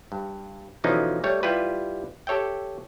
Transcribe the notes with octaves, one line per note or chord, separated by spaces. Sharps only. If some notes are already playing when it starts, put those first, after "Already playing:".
G2
B2 D3 E3 F3 C#4 D#4
G3 A3 C#5
G3 E4 F4 G4 B4
G4 A4 C#5 E5 G5